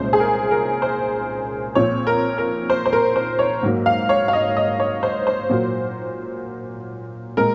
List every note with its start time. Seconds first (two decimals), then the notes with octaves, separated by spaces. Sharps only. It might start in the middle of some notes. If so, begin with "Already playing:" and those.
Already playing: C2 A#2 G#3 C#4 C5
0.13 G#4
0.20 A#4
0.51 A#4
0.82 C5
1.75 A#2 F3 C4 C#5
2.07 A#4
2.38 A#4
2.70 C5
2.86 C5
2.93 A#4
3.16 C5
3.39 C#5
3.63 G#2 F#3 A#3
3.86 F5
4.09 C#5
4.28 F5
4.33 D#5
4.57 D#5
4.80 C#5
5.03 C5
5.27 C5
5.49 A#2 F#3 A#3
7.37 A#2 G#3 C4 A#4